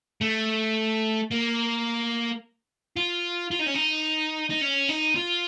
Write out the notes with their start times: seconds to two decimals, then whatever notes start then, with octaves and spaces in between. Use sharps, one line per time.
0.21 A3
1.31 A#3
2.96 F4
3.51 F4
3.59 D#4
3.66 C#4
3.74 D#4
4.50 D#4
4.61 C#4
4.89 D#4
5.16 F4